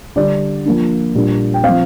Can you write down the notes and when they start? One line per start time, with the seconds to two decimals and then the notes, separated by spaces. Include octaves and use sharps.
0.16 D3 G3 D4 D5
0.66 F3 A#3 D4
1.15 A#2 G3 A#3 D4
1.54 G5
1.64 C4 F5
1.69 F3